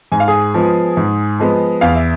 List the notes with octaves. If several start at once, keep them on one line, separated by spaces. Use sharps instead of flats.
G#2 G#5
F5
G#4 G#5
F3 G#3 B3
G#2
F3 G#3 B3
E2 F5
E5